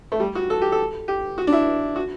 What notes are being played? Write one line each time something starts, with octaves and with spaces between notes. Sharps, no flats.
A3
G3
F#4
A4
G4
A4
G4
F#4
D4
E4
F#4